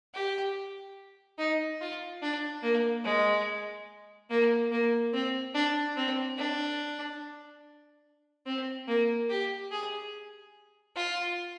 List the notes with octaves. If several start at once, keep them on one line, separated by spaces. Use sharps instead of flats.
G4
D#4
F4
D4
A#3
G#3
A#3
A#3
C4
D4
C4
D4
C4
A#3
G4
G#4
F4